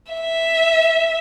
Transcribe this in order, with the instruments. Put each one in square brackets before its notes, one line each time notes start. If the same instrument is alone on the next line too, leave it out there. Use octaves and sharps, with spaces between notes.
[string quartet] E5